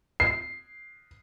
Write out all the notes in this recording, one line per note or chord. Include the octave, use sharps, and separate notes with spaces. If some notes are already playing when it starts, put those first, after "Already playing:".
C7